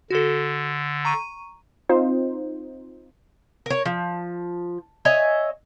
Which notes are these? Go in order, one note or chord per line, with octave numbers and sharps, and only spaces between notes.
D3 F#4 A4
A#5 C#6 D#7
C4 D#4 F4 C5
A#4 C#5
F3
C#5 D#5 E5 G#5